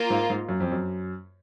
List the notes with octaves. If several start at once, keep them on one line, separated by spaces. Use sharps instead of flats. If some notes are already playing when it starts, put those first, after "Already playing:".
Already playing: A#3 F4
G#2
G#2
F#2
F2
F#2